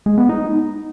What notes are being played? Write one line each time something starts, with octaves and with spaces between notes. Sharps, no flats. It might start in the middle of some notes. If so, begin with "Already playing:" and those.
G#3
B3
D#4